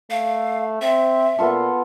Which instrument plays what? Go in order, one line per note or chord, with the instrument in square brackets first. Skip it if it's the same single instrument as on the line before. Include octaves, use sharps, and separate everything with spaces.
[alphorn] A3 [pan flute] F5
[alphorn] C4 [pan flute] E5
[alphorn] A#2 [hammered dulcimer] B3 F4 A4